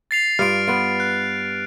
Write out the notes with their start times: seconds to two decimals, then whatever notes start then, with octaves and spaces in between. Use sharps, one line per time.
0.11 A6 C7 F7
0.39 G2 F4 F6 D7
0.67 B3 F4 D7
1.00 F#6